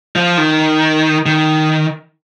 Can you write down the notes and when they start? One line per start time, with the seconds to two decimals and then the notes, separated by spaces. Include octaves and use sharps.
0.16 F3
0.38 D#3
1.26 D#3